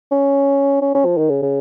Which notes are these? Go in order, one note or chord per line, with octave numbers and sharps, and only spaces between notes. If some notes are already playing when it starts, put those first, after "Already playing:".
C#4
C#4
C#4
F3
D#3
C#3
C#3